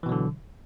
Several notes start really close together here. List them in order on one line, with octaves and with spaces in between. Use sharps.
E3 B2 F#3 D3